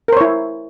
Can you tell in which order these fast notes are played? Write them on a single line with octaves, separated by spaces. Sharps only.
A#4 C5 C#5 E4